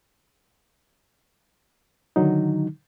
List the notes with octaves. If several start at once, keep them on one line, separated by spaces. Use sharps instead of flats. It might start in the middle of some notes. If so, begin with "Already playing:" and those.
D3 D#3 F#3 D#4